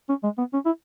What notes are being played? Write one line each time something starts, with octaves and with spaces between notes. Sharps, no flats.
C#4
G#3
B3
C#4
E4